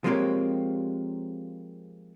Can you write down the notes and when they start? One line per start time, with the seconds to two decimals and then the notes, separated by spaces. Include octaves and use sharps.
0.04 F3 G#3 A#3 C4 G4 C#5